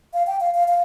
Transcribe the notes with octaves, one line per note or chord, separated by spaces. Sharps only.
F5
G5
F5
F5
F5